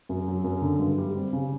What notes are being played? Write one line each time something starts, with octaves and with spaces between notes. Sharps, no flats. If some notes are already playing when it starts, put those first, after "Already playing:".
F#2
F#3
F#2
D3
G2
G3
C4
C#3